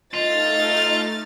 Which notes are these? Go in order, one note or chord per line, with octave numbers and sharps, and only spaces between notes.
A3 D#4 F4 D#5 F6 A6